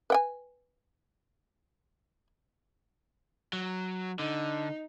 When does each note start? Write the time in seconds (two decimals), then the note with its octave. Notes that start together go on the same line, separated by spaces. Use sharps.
0.10 B4 G5 G#5
3.53 F#3
4.19 D3 D#4